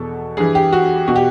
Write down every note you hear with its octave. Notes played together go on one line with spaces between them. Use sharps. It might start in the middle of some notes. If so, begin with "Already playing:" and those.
Already playing: E2 B2 A4
G2 E3 G#4
G4
F#4
B2 F#4
G4